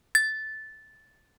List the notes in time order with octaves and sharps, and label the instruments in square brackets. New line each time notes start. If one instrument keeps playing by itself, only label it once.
[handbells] A6